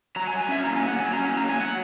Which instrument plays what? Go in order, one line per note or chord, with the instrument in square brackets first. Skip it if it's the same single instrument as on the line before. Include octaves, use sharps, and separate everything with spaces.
[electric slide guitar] F#3 A#5
G#5
F#3
G#5
C#4 E5
A#3 A#5
G#5
F#3
F#5
F#3 G#5
C#4 A#5
G#5
A#3
A#5
F#3
G#5
F#3 F#5